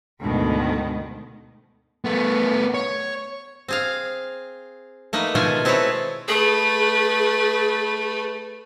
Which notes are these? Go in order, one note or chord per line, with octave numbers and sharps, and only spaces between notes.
D2 G#2 B2 D#3
A3 B3
C#5
C4 G#4 F5
A3 A#3 D#4 B4
B2 D#3 G#3 A3 F4 G#5
C4 E4 G#4 A4 B4 C#5
A3 G#4 B4